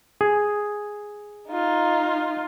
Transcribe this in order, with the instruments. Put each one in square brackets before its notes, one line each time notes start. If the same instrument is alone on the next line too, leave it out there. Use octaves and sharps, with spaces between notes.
[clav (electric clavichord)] G#4
[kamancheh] D#4 F4